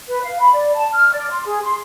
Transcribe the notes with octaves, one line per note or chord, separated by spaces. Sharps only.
B4
F5
B5
D5
A5
F6
D5
C6
G#4
C6